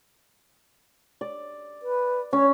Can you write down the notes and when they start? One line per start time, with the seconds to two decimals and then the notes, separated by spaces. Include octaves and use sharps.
1.21 D5
1.82 B4
2.33 C#4 C#5